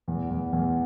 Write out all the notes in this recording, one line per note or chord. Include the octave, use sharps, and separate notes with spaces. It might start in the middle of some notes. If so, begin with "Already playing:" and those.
E2
E2
E2